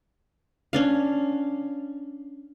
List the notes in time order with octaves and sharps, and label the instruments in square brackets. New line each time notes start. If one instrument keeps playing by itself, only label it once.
[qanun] C#4 D4 F5